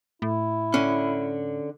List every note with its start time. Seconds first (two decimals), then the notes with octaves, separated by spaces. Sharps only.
0.22 A2 E4
0.74 D3 C#4